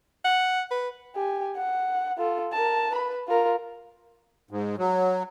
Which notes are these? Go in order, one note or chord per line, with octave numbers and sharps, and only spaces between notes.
F#5
B4
G4 G#5
F#5
F4 A4
A#4 A5
B4 B5
F4 A#4
G#2
F#3